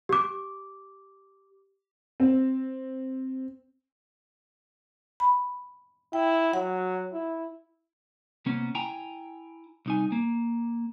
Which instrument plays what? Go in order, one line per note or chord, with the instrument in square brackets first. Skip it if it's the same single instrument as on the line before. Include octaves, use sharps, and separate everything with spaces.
[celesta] G4 D6
[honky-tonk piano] C4
[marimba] B5
[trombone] E4 [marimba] G5
[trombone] F#3 [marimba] F#5
[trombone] E4
[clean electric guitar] C3 A#3 B3 C#4
E4 G5 G#5 A#5
C2 D#4 G#5
A#3